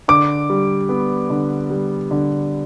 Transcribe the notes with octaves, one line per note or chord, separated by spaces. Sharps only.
D3 D6
G3
B3
D3
G3
D3